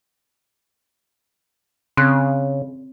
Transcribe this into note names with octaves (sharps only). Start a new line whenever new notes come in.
C#3 C4 F#6